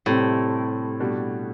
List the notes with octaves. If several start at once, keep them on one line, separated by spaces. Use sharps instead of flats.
A2 C3 G3 C4
B2 G3 D4 F#4